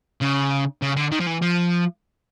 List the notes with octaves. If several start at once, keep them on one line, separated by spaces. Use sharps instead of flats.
C#3
C#3
D3
D#3
F3
E3
F3